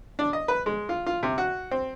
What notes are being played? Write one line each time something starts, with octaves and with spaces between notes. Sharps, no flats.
D4
D#5
B4
G#3
F4
F4
C3
F#4
C4